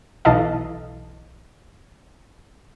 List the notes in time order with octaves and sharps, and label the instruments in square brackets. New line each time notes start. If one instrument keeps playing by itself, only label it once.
[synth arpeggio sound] B1 E3 A4 D#5 F5